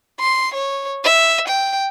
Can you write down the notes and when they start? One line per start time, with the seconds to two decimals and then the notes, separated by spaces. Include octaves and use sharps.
0.20 C6
0.54 C#5
1.04 E5
1.48 G5